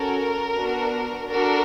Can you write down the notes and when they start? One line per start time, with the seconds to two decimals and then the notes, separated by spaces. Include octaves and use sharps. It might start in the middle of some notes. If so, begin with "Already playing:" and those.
Already playing: C#4 F#4 A4 A#4
0.54 B3 D4 F#4
1.29 D4 F#4 A4 A#4